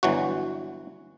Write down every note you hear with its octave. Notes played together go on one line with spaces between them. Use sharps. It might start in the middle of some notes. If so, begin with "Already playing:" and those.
G1 E3 F#3 F#4